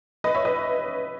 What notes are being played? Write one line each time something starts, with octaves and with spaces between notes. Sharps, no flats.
B4 D#5
C#5 E5
B4 D#5